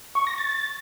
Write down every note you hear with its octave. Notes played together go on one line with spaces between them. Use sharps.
C#6
A#6
A6